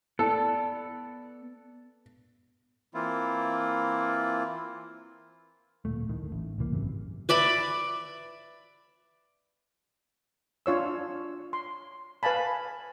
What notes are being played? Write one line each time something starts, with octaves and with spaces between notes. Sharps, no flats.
B3 A4 D5
E3 A#3 C4 E4 F4
D1 G1 A#2 A3
D1 A2 D#3
A1
E1 C2 E3 A#3
G#1 F#2 C3
B4 D5 E5 B5
D4 F4 C#5 E6
C6
B4 F5 G#5 A5 B5